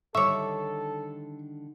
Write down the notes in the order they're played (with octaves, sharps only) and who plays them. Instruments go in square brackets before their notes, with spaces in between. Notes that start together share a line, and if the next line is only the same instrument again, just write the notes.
[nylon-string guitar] D3 D#3 G3 [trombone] A4 [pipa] C#5 E5 [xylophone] C#6 D6